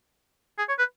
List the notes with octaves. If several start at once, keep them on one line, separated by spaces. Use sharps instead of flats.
G#4
C#5
B4